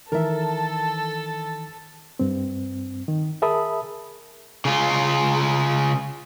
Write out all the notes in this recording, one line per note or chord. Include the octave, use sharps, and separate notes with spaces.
D#3 E3 A4 A#4 E5
G2 C4
D#3
G#4 A#4 E5 A5 B5 D#6
C#3 F4